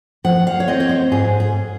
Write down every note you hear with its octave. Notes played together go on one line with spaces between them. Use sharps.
F3 F#5
F5
C#5
C4 D#5
C#5
C5
G#2 G#4
G#4